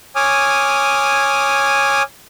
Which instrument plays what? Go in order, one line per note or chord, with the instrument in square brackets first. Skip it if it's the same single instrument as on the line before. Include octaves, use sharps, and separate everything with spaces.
[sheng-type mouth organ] C#5 G#5 D6 D#6 F6